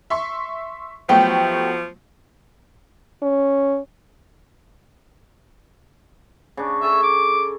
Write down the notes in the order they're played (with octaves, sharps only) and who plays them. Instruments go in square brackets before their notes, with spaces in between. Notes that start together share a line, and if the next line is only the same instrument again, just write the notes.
[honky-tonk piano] E5 C6 C#6
[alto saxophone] F3 [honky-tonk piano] F#3 A3 B3 [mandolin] G4 G5
[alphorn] C#4
[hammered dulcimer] C#3 D4
[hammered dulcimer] A4 G#5 C#6 [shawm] E5
[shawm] D6